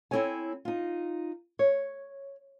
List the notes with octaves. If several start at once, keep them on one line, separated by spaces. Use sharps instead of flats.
C4 E4 G4 A4 C#5 G#5
D#4 F4
C#5